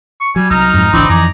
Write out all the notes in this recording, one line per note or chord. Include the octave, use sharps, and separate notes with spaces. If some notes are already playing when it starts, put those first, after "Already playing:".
C#6
F#3 G3 G#5
C2 D#4 A#5 F6
F2 G#2
G#1 C#2 D3 E3 C4 D4 B4 D5
F2 E3 D5 G#5 A#5